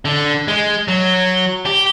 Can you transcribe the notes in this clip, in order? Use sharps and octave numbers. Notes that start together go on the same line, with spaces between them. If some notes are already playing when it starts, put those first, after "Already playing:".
D3
G#3
F#3
G4